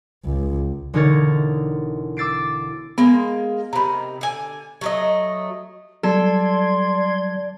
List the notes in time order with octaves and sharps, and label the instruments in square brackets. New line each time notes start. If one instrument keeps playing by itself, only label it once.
[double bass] C#2
[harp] E1 D3 D#4 A#4 C#5 A6
D6 E6 A6 C7 D7
[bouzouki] G#3 A#3 [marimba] B3
[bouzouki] C3 D#3 [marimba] A#5 B5
[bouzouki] D3 G#5
F#3 A3 D#5
[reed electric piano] F#3 G3 [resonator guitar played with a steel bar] A4 [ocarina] D5 [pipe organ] C6 G#6